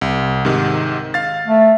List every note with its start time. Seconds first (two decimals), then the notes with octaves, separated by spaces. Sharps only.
0.01 C2
0.45 G#2 C3 D#3
1.14 F5 A6
1.47 A3